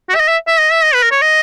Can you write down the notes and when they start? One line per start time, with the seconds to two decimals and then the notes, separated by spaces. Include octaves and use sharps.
0.10 F#4
0.15 E5
0.20 D#5
0.28 E5
0.47 E5
0.60 D#5
0.72 E5
0.84 D#5
0.94 B4
1.03 A#4
1.11 C#5
1.22 D#5